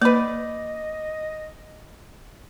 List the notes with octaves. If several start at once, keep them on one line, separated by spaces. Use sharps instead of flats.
A#3 B4 D5 D#5